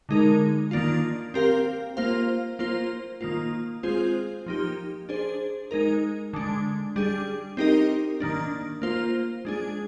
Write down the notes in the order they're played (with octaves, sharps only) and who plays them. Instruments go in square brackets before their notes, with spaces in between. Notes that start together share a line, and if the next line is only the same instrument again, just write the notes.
[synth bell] D3 G#3 D#4 A#4
D#3 A#3 D4 F4
C4 G4 A#4 F5
A#3 F4 C5 F5
A#3 F4 C5
D#3 A#3 F4
G#3 C4 F4 G#4 C5
F3 A#3 D#4 G4
D4 G#4 C5
G#3 D#4 A#4
D3 G#3 D4
G3 D4 G#4
C4 D#4 G4 A#4 D#5
D#3 A#3 D4
A#3 F4 C5
G#3 D4 G#4